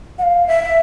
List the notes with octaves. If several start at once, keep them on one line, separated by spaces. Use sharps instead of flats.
F#5
F5
E5